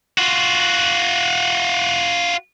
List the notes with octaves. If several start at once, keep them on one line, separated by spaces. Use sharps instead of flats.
F4 F#4